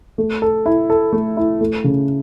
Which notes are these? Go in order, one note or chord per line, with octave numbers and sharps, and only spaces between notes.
A3
A4
E4
A4
A3
E4
A3
C#3